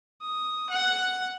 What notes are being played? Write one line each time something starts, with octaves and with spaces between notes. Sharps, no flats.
D#6
F#5